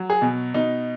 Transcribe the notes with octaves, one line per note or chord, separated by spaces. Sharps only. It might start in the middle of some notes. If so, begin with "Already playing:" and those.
Already playing: F#3
G#4
B2
B2 D#4